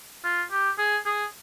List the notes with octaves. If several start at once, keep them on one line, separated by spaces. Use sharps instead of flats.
F4
G4
G#4
G#4